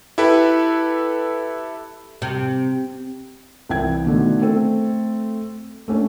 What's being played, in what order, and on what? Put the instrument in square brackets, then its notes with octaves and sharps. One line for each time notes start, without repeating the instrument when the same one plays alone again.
[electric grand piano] E4 G4 A4 B4
[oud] C3
[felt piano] C2 E3 G5 G#6
B2 D3 D#3 A3
A3 C4 A4
A3 A#3 C#4 D4